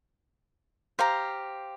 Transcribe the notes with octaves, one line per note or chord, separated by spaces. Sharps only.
G4 C5 F5 A#5